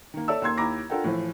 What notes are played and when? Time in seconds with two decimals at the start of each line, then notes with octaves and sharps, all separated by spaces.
0.14 D#3 A#3
0.28 A4 C#5 D5 E5 A5 E6
0.42 D#2 A#3 C6 G#6
0.57 D#2 E4 A#5 B5 D6 A#6
0.90 D4 F4 A4 A#4 F#5 G5
1.04 A2 E3 F3